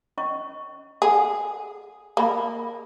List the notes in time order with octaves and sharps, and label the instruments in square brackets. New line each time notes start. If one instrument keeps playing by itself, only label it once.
[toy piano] C#4 D#5 C#6
[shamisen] G#4 [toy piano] A4 F#5
[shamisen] A#3 [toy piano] G#4 B5